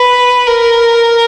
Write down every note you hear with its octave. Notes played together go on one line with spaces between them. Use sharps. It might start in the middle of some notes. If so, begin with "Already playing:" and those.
Already playing: B4
A#4